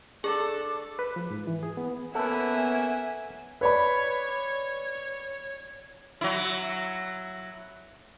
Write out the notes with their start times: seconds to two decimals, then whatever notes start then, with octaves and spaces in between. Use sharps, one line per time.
0.24 D4 G#4 A4
0.99 B4
1.16 F3
1.30 G#2
1.47 E3
1.63 G#4
1.77 B3
2.15 A#3 B3 C#4 A4 B4 E5 F#5 G#5
3.61 B4 C#5 D5 B5
6.21 F#3 E4